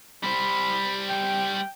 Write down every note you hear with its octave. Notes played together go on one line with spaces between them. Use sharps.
G3 C5 B5
G5